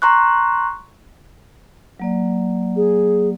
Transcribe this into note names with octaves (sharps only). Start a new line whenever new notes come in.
A#5 C6 C#6 F#6
F#3 A#3 D5
G#4